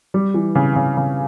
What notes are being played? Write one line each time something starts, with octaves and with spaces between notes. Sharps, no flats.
G3
E3
C#3
C#3
C#3